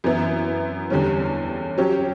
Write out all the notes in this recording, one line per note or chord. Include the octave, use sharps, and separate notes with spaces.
F#2 E3 B3 E4
E2 D3 G3 C#4
F#3 C#4 G4